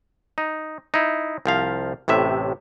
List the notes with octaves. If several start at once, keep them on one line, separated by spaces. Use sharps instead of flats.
D#4
D#4 E4
C2 F3 F5
A1 A2 C3 E5